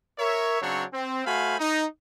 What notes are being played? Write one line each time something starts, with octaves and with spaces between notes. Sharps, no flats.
A#4 C#5 E5
C#3 F#3 C4 D4 C#5
C4
A3 F#4 C5 F5 G#5 B5
D#4